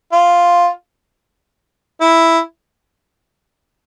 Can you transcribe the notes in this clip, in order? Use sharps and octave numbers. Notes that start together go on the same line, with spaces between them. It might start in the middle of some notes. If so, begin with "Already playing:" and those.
F4
E4